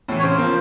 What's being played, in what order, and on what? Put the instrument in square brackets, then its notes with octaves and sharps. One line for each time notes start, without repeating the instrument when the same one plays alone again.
[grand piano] A2 E3
[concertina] C#5
[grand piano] C#3 [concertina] C5
[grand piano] F3 A#3